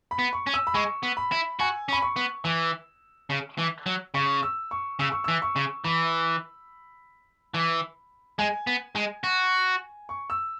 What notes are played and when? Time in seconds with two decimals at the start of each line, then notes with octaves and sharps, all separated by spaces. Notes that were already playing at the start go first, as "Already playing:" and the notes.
0.11 B5
0.19 B3
0.33 C#6
0.47 C#4
0.54 E6
0.67 B5
0.74 G#3 C#6
1.03 B3
1.17 B5
1.32 E4
1.59 F#4 G#5
1.89 C#4
1.93 B5
2.02 C#6
2.16 B3
2.44 E3 E6
3.30 C#3
3.58 E3
3.86 F#3
4.14 C#3 C#6
4.43 E6
4.71 C#6
4.99 C#3 E6
5.12 C#6
5.24 E3 E6
5.42 C#6
5.56 C#3
5.84 E3 B5
7.54 E3
8.39 G#3 G#5
8.67 B3
8.96 G#3
9.24 F#4
10.09 C#6
10.30 E6